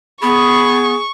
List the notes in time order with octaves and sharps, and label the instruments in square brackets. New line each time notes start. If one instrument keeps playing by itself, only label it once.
[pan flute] B3 [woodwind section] G#4 [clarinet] B5 [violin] C#6